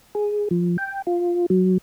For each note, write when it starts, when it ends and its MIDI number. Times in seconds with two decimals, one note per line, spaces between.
0.15 0.48 68
0.51 0.77 53
0.78 1.02 79
1.07 1.46 65
1.50 1.78 54